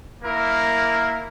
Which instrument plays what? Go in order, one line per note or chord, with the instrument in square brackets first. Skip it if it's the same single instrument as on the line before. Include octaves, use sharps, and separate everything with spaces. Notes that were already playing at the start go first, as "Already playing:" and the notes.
[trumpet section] A#3 E4 A#4